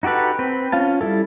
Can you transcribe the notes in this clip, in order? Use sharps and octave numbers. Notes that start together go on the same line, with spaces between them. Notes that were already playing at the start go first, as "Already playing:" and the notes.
D#4 F#4 G4 A4 B4
C4 B4
C#4 F4 F5 A5
G3 E4 A4